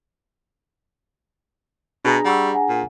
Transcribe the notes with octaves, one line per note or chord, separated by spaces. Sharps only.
B2 D4 G#4 A#5
G3 F#5 C#6 E6
F#5 G#5
A#2